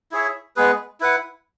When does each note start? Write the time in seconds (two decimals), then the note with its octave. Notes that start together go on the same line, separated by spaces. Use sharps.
0.12 E4 G#4 C#5 E5
0.56 G#3 B3 G#4 B4
1.00 E4 B4 F#5